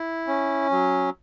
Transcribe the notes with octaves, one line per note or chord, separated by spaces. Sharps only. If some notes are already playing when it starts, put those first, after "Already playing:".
Already playing: E4
C#4
F#3